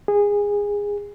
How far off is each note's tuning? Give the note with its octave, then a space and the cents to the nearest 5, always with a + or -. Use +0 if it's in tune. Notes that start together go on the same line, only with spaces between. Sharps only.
G#4 -20